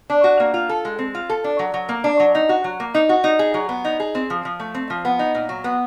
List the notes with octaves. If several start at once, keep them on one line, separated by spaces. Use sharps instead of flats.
D4
F#4
A#3
F4
A4
G#3
C4
F4
A4
D4
F#3
F#3
A#3
D4
F#3
D#4
F#4
F#3
A#3
D#4
F#4
D#4
G#4
F#3
B3
D#4
G#4
C4
F3
F3
A3
C4
F3
B3
D#4
A#2
F#3
B3